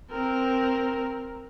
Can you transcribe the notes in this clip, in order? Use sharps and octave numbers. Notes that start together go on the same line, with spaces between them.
C4 A#4